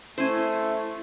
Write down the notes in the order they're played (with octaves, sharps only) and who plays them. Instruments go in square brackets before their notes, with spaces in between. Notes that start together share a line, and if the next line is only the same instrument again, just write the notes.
[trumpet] A3 [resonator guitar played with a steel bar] C#4 C5 [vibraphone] E4 E5